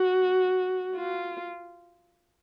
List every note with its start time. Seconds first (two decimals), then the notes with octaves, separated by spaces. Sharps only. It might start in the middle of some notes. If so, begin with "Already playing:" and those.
Already playing: F#4
0.96 F4